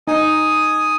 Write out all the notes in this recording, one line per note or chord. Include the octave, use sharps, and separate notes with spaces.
D#4 G#5 D#6